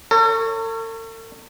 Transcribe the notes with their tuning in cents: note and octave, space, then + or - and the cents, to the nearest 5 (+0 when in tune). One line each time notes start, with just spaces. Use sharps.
A4 +45 C#5 +0